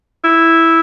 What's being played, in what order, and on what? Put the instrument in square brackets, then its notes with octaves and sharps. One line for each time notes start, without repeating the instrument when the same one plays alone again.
[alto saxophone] E4